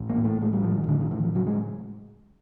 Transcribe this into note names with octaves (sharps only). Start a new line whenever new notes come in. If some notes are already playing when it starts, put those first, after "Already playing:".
Already playing: A1
A#3
A2
A3
A1 G#3
G3
A1 F3
D#3
A2 D3
D#3
A2 E3
F3
C#3 F#3
G#3